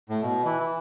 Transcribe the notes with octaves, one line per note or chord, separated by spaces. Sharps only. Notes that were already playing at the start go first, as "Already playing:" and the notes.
A2
B2
E3
E3